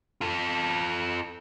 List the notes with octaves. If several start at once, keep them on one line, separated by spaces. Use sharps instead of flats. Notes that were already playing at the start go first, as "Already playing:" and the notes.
F4 A4